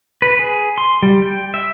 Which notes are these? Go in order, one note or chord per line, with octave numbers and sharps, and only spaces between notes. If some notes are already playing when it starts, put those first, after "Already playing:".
B4
G#4
C6
G3
G5
E5